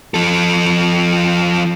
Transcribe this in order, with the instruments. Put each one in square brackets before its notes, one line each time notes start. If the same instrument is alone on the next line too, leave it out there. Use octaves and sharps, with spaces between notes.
[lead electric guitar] F3 A4